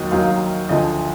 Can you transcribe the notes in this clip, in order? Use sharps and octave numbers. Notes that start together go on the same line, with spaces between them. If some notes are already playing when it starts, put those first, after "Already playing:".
Already playing: D#2 D#3 F#3 D#6
D#2 D#3 F#3 F5
D2 D3 F3 D#5